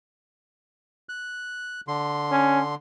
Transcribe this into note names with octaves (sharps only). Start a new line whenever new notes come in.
F#6
D3 C6
C#4